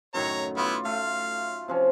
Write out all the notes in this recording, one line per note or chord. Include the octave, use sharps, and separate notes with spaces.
F#2 A2 D#3 C#5 A#5
B3 E4 F4 D6
A3 F5
C3 F3 C#4